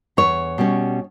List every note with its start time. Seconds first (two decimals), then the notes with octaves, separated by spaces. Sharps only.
0.17 E2 C#5
0.58 B2 G3 C#4